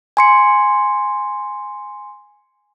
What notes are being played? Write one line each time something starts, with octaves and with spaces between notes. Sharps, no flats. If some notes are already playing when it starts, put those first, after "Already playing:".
G#5 C6 C#7